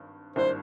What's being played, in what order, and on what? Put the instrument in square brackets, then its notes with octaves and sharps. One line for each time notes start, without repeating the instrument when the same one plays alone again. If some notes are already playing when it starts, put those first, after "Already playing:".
Already playing: [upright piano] G#1 G2
[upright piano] G#1 G2 G3 A#3 E4 [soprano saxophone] C5